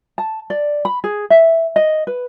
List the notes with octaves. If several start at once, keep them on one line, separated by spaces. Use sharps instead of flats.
A5
D5
B5
G#4
E5
D#5
B4